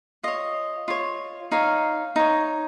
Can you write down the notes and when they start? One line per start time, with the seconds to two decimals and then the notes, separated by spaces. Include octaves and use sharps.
0.23 F4 C#5 D#5
0.88 F4 C#5
1.52 D#4 C#5 F5
2.16 D#4 C#5